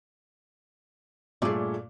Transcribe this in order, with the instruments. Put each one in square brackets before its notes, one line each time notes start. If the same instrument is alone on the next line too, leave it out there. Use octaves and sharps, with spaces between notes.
[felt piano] G2 A#2 A3 [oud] G#4 D5